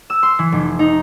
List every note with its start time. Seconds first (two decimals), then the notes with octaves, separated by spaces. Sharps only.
0.10 E6
0.23 C6
0.39 E3
0.52 F1
0.79 D#4